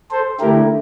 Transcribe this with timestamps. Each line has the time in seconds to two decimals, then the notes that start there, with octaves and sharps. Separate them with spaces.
0.11 A4 C5
0.40 D3 A3 E4 G4 A#4